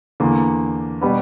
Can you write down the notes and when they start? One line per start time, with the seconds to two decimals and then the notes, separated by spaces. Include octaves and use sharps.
0.20 E2 D3 A#3
1.01 B2 G3 B3